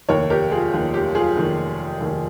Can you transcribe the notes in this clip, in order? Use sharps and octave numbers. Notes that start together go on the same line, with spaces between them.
F1 D#2 D#3 A#4 C#5
G4 A#4
F4 G#4
F1 D#2 D#3
G4
F4 G#4
F1 D#2 D#3
F1 D#2 D#3